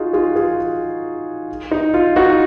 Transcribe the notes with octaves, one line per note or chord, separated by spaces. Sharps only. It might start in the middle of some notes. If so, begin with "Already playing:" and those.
Already playing: D#4 F4 F#4 G#4
F4 G#4
F4 G#4
D#4
F4
D#4 F#4